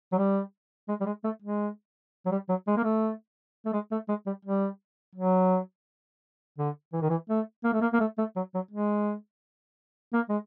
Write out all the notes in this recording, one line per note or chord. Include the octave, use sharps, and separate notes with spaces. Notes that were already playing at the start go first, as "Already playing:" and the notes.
F#3
G3
G#3
G3
G#3
A3
G#3
F#3
G3
F#3
G#3
A#3
A3
A3
G#3
A3
G#3
G3
G3
F#3
D3
E3
D#3
E3
A3
A#3
A3
A#3
A#3
A3
A3
F#3
F#3
G#3
A#3
G#3